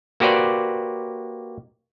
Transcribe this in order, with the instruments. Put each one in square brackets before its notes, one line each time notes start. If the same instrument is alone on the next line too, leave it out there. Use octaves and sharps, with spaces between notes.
[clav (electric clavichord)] A#3 F#4 G4 B4 C5 D5